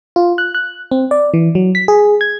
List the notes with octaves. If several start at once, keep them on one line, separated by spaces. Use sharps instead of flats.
F4
F#6
F#6
C4
D5
E3
F#3
B6
G#4
G#6